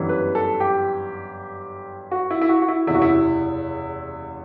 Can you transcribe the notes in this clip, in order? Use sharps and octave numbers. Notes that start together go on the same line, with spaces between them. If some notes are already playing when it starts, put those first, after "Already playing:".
Already playing: G1 F#2 E3 G3
B4
A4
G4
F#4
E4
E4
F#4
F#4
E4
F#1 E2 C3 E4
F#4
E4